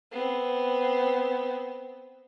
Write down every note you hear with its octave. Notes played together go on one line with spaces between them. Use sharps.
B3 C4